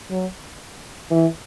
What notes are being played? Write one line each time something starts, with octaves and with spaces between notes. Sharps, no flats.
F#3
E3